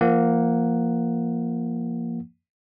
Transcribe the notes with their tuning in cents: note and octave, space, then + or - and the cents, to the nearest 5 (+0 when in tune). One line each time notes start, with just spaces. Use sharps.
F3 -25 A#3 +0 F#5 +0